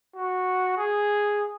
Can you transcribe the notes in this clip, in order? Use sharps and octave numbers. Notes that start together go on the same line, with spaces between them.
F#4
G#4